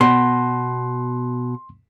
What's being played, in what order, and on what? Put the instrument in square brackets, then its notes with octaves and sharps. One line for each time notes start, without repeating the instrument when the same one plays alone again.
[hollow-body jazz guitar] B2 [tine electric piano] C6